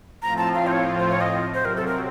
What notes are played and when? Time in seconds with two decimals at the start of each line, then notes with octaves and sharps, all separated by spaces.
0.22 A2 F3 C4 F4 A#5
0.38 A5
0.54 F5
0.67 C5
0.72 C#5
0.99 C5
1.10 C#5
1.21 D#5
1.54 C3 F#3 C4 C5
1.65 A#4
1.77 A4
1.87 A#4